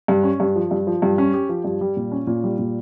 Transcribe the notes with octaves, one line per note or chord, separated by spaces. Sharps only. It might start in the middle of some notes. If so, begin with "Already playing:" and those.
G2
C#4
G2
F3
G2
F3
G2
C#4
G4
F3
G2
G3
A#2
C#4
A#2
G3
A#2